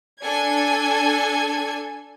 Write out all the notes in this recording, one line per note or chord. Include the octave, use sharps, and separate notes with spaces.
D4 A4 G#5 G#6